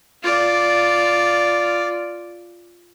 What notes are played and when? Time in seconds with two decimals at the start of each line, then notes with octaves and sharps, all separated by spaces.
0.24 F4 D5